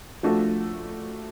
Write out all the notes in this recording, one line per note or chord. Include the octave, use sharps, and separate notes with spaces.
F3 A3 D4 F#4 A4